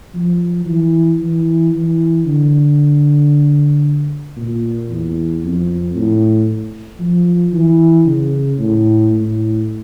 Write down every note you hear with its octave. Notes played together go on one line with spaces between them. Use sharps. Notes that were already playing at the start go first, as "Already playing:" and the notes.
F3
E3
E3
E3
D3
A#2
E2
F2
A2
F3
E3
C#3
A2
A2